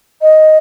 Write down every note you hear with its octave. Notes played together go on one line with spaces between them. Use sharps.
D#5